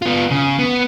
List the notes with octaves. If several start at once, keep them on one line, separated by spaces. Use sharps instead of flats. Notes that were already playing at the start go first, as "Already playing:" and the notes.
B3 F4
C#3
B3